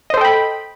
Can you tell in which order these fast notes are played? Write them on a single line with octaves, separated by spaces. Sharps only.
D#5 C5 A4 G5 B5